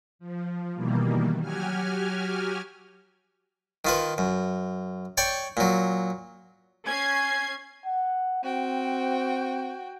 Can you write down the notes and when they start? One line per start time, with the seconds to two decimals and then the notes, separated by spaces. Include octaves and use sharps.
0.19 F3
0.74 B2 D#3 E3 G3 A#3
1.41 F#3 F#4 G4 G#5 F6
3.85 D#3 F4 B4
4.18 F#2
5.18 C#5 D5 G5 C#6
5.57 A#2 F#3
6.87 C#4 G#5 G#6 C7
7.85 F#5
8.43 C4 F#4 G5